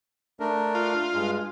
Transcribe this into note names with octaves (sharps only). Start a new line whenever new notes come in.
A3 D4 A#4
F4
G2 G#3